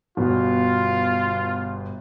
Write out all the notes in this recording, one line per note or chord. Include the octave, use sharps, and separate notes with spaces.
G1 B2 F4